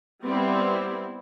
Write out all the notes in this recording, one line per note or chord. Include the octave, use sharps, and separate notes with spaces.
G3 B3 C4 E4